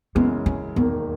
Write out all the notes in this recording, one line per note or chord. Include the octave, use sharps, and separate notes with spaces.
F#2 C#3 E3 G#3 B3
C#4
E1 D#2 D#3 A#3 B3